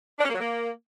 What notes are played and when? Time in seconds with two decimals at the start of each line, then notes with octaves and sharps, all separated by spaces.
0.19 D4
0.24 C#4
0.30 A#3
0.35 F#3
0.40 A#3